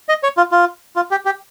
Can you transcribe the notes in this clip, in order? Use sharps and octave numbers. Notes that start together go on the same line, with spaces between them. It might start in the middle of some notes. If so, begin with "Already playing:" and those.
D#5
C#5
F4
F4
F4
G4
G4